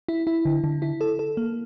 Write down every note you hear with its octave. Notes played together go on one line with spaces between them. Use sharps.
E4
E4
D3
D3
E4
A4
A4
A#3